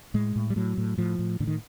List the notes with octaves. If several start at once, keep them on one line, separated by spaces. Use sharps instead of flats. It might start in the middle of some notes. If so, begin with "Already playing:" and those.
A2 G#3
A2
G3
A2 F#3
A2
A2 F3
A2
A2 D3
D#3